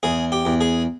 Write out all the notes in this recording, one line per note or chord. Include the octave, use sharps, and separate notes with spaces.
E2 G#4
G4
E2
G#4